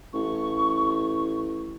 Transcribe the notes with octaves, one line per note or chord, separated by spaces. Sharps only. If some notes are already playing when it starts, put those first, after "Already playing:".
A1 C#6